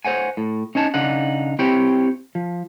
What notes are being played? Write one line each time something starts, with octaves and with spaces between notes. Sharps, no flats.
C5 C#5 F#5 G#5
A2
C#4 D#4 C#5 A5
C#3 D4 D#4 F#5
C4 E4 G4 C#5 G5
F3